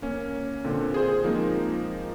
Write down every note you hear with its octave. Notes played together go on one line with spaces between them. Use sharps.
A#3 C#4
A#2 D3 C4
G#4 C5
F3 G#3 A#3 C4 D#4